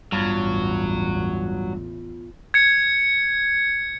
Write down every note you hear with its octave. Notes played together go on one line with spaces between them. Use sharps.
A1 E2 G2 F#3 B3 F4
G#6 C#7